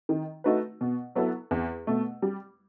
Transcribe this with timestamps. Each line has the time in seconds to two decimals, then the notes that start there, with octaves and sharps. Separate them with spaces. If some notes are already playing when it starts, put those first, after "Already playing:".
0.09 D#3
0.44 A3 D#4 F#4 B4
0.81 B2
1.15 F#3 B3 E4 A4
1.51 E2
1.87 B2 A3
2.22 G3